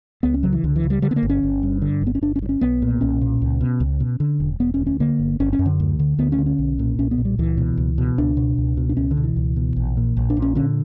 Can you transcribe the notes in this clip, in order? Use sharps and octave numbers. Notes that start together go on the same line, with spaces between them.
C#2 B3
C#4
C#3 F#3
E3
C#2 D3
E3
C#3
G3
D3 G3
B3
A#3
G1
C#4
G1
G2
D3
G1
B3
C#4
G1 D4
C#4
G2
C#4
B1 B3
A#2
B1 C#4
A#2
C#2
B2
C#2
B2
D3
E1
E1 B3
C#4
D2
C#4
D3 A#3
G1
G1 C#4
C#4
F#2
D3
D2
D3
D2 B3
C#4
D3
C#4
B1
A#2
B1 C#4
B3
A#2
G3
C#2 E3
B2
C#2
B2
C#2 D4
B2
C#2
B2
D4
C#2 C#4
D3
B2
E3
C#2
B2
A#1
A#2
A#1
D4
A#2
C#4
D3 C#4